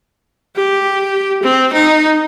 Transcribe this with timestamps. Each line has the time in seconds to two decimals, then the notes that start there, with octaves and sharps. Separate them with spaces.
0.56 G4
1.43 C4
1.73 D#4